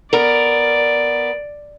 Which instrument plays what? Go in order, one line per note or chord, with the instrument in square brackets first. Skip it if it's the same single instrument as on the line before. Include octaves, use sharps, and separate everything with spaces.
[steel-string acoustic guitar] B3 A#4 [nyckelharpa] D5